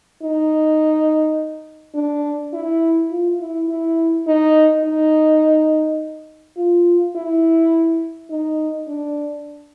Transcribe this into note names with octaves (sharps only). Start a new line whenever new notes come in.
D#4
D4
E4
F4
E4
E4
D#4
D#4
F4
E4
D#4
D4